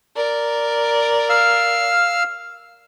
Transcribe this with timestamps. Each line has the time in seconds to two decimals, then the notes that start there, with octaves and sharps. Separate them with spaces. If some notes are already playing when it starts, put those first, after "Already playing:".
0.16 A#4 D5
1.29 F5 E6 F6